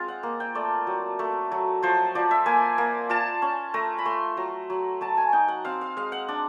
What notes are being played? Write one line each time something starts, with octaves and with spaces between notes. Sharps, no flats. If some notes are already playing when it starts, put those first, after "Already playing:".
Already playing: G#3 C4 F4
F#5
A#3
G5
A3 D5
F#3
A3
F#3
F3 C5
F3 D5
E5
A#3 G#5
A#3
F4 A5
C#4
A3 A#5
B5
A3 C6
F#3 A#5
F#3
F#3 A5
G#5
D#4 G5
F#5
C4 F5
F5
G#3 F5
F#5
D4